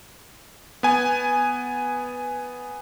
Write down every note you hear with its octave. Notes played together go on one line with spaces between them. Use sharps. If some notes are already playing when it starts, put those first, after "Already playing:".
B3 G#5